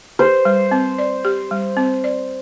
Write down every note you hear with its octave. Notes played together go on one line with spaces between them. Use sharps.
G4 C5
G3
C4
D5
G4
G3
C4
D5